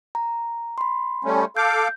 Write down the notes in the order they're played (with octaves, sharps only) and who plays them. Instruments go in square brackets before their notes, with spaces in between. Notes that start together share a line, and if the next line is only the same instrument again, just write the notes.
[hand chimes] A#5
B5 C6
[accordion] G3 A3 C#4
[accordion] A4 F5 D6 [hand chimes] G6